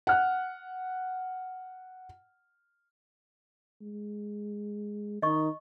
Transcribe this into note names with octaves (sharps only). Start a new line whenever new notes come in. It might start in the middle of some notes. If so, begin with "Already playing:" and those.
F#5 F6 F#6
G#3
D#3 D#4 D#5 C#6